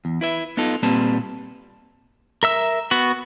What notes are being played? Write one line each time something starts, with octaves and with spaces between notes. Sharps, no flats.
E2
E4 B4 E5
B3 D#4 F4 A4
A#2 G3 A#3 C4 B4 A5
A#4 E5 E6
B3 F#4